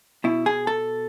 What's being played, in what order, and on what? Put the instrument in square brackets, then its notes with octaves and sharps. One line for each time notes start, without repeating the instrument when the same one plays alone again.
[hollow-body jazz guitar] B2 E4
G#4
A4